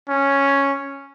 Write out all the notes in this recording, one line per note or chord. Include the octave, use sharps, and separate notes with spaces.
C#4